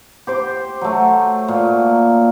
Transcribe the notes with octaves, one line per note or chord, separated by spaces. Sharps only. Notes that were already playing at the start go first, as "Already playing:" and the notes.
G4 C5 D6
F#3 A3
A#2